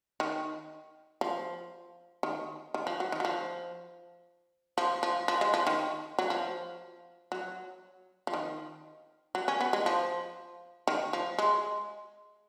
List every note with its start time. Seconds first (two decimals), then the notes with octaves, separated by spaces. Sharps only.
0.20 D#3
1.21 F3
2.23 D#3
2.74 D#3
2.87 F3
3.00 F#3
3.12 D#3
3.20 F#3
3.25 F3
4.78 F3
5.03 F3
5.28 F3
5.41 G#3
5.54 F3
5.67 D#3
6.19 F#3
6.30 F3
7.32 F#3
8.27 F3
8.34 D#3
9.35 F#3
9.48 C#4
9.61 B3
9.73 G#3
9.86 F3
10.87 D#3
11.13 F3
11.39 G#3